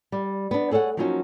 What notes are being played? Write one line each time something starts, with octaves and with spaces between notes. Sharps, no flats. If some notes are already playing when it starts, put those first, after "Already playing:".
G3
B3 D4
G#4 A4 C#5 F5 F#5
F3 F#3 A#3 C#4 D#4 F#4